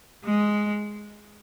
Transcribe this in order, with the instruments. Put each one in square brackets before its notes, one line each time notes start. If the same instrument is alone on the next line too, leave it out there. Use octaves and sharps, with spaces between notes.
[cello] G#3